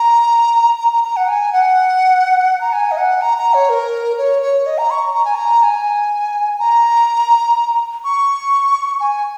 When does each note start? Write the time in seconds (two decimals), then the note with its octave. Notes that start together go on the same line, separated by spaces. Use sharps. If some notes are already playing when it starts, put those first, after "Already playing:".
Already playing: A#5
0.80 A#5
0.92 A#5
1.04 A#5
1.16 F#5
1.28 G#5
1.53 F#5
2.61 A#5
2.73 G#5
2.91 D#5
2.98 F#5
3.21 A#5
3.38 A#5
3.54 C#5
3.69 A#4
4.18 C#5
4.42 C#5
4.66 D#5
4.78 A#5
4.91 C#6
5.15 A#5
5.25 G#5
5.35 A#5
5.63 G#5
6.59 A#5
8.04 C#6
9.00 G#5